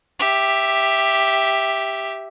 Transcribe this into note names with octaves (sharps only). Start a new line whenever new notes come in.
G4 E5